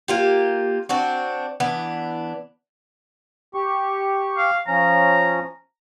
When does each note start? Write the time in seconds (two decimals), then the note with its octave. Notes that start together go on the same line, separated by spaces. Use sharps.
0.08 A#3 F4 G4
0.89 C4 D4 F#4
1.60 E3 B3 D4
3.54 G4 C#6
4.38 F5
4.68 F3 C#4 A#5